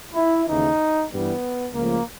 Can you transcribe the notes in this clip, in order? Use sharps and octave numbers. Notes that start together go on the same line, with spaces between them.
E4
D#2 C#3 E3 D#4
G2 E3 G3 B3
C#2 C#3 F3 A3 A#3